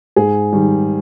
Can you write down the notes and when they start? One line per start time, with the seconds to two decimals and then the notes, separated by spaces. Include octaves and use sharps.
0.16 G#2 G#4
0.53 D#3 G3